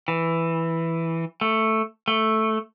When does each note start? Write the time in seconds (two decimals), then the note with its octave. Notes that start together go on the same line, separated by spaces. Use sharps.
0.08 E3
1.41 A3
2.08 A3